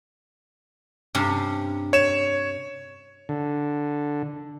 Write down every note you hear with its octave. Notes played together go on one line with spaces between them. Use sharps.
G2 C3 C#4
C#5 E7
D3